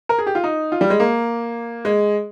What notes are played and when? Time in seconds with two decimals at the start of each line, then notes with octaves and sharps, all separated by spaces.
0.09 A#4
0.18 G#4
0.27 G4
0.35 F4
0.44 D#4
0.72 F4
0.81 G3
0.90 G#3
1.00 A#3
1.85 G#3